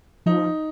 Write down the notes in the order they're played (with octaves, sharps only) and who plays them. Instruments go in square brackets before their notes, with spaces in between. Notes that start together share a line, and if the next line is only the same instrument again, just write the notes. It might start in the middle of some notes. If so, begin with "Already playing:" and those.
[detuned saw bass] F3 [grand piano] D#4